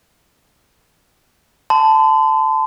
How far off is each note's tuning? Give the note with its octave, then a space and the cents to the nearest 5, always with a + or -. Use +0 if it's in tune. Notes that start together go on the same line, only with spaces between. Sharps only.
A5 +0 C6 -40